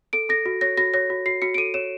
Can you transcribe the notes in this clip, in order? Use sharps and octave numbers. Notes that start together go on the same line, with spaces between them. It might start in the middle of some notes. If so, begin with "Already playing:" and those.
A4 D7
A4 A#6
F#4
C#5 A#6
F#4 A#6
C#5 A#6
F#4
F#4 C7
F#4 C#7
D7
A4 D#7
C#5 E7